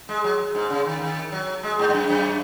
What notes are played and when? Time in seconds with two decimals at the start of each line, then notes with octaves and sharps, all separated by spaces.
0.09 G#3
0.24 F#3
0.55 G#2
0.70 C#3
0.86 D#3
1.02 D#3
1.32 F#3
1.63 G#3
1.79 G#2
1.89 G#2
1.94 F#2
2.09 F#2